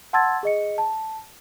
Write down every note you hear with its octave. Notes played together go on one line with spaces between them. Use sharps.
F#5 A5 C6 E6 G#6 A6
G#4 D#5 C#7
A5